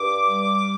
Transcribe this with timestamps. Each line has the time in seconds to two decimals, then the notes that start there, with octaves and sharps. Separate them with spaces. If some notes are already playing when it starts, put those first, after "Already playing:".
Already playing: G2 D6
0.23 G3